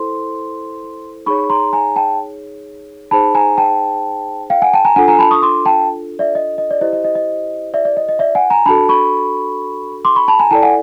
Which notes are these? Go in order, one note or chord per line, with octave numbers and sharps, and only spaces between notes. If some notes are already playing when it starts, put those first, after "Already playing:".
Already playing: E4 A4 C5 C6
D#4 G#4 C#5 B5 C#6
A#5 C6
G#5 A#5
G5 A5
D#4 G#4 C5 A5 B5
G#5 A#5
G5 A5
F5 G5
F#5 G#5
G5 A5
G#5 A#5
D4 F4 A4 F#5 G#5
G#5 A#5
A5 B5
C#6 D#6
C6 D6
G5 A5
D5 E5
D#5
D#5
D5
E4 G4 C5 D#5
D#5
D#5
D#5
D5 E5
D5
D#5
D#5
D5 E5
F#5 G#5
G#5 A#5
D4 F#4 A4 A5 B5
B5 C#6
C6 D6
B5 C#6
A5 B5
G#5 A#5
E4 A4 D5 G5 A5
F#5 G#5